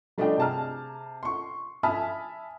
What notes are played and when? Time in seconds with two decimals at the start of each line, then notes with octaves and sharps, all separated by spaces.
0.18 G3 A3 D4 F4 D#5 G5
0.38 C3 G#4 A5 A#5 F6
1.23 C6 C#6
1.83 E5 G#5 A5 B5 D#6 F6